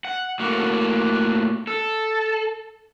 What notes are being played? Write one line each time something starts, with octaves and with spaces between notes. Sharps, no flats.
F#5
A2 A#3 F#4
A4